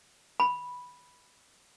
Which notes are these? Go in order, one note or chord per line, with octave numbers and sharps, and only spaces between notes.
B5